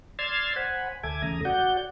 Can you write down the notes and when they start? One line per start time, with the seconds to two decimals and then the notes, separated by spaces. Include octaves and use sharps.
0.19 D5 C6 E6 F6 G#6 A6
0.56 C5 F#5 G#5 B5
1.03 D2 A4 E5 G#5 D6 G#6
1.22 E2 C#3 A3 A#5 D#6
1.45 F#4 D5 F#5 G6